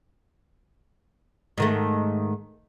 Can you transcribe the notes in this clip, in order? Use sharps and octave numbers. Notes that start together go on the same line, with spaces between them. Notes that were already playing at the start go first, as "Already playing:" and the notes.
G#2 D#3 A3